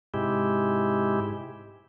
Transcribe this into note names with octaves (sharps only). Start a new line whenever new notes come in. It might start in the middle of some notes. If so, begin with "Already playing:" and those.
G#2 C3 G#3 E4 G4